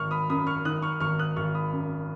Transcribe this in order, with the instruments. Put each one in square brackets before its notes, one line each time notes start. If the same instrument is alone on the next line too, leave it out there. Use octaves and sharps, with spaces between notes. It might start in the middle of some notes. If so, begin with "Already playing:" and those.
Already playing: [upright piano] G#1 [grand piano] C#6 F6
[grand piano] B5 D#6
[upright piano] F#2 [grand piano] B5 D#6
[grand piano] C#6 F6
[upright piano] D#3 [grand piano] D#6 F#6
[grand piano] C#6 F6
[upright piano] G#1 [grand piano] C#6 F6
[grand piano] D#6 F#6
[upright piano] G#1 [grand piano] C#6 F6
[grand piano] B5 D#6
[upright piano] F#2